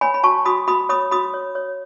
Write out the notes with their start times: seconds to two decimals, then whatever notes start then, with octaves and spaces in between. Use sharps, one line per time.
0.01 C#5 G#5 B5
0.14 B5
0.23 F#4 A5 C#6
0.45 F#4 B5 D#6
0.68 F#4 B5 D#6
0.89 C#5 B5 D#6
1.11 F#4 B5 D#6
1.34 C#5
1.55 C#5